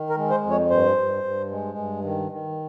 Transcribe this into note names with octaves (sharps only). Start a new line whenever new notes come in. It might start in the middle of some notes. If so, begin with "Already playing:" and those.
Already playing: D#3
A#4
G#3
C5
F2
C#5
G2 C5
G2
G2
G#3
G2
D#3
D#3